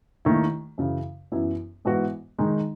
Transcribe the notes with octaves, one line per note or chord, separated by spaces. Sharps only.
D#2 D#3 A3 E4
F#2 C#3 E3
F#2 E3 B3 E4
G#2 E3 B3 F#4
D#3 G#3 D#4